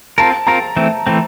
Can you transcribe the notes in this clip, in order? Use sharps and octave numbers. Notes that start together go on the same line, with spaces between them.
C4 F4 A#4 A5
C4 F4 A#4 A#5
E3 A3 C4
E3 A3 C4